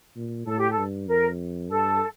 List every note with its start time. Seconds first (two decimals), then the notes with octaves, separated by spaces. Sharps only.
0.16 A#2
0.46 A2 A4
0.58 G4
0.71 A4
0.77 G2
1.07 F2 A#4
1.69 G2 A4